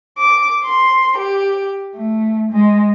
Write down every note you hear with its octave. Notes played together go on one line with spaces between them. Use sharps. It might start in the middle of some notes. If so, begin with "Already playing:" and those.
D6
C6
G4
A3
G#3